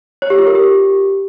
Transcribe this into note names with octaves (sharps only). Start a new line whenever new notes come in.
C#5
G4
F4
A#4
G4